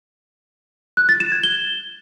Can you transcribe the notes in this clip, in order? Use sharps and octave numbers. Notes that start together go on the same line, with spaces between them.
F#6
A6
E7
G#6
G7